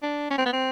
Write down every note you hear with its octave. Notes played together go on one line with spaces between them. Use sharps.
D4
C#4
C4
B3
C4